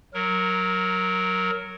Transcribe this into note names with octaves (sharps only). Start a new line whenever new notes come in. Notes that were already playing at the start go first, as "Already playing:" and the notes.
F#3 A#4